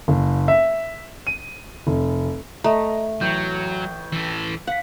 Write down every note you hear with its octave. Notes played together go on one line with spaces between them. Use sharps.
F#1
E5
D#7
F1
A3 D#5 A#5
A1 F#3 C#6 G6
E3 A4
F5 F#5 B6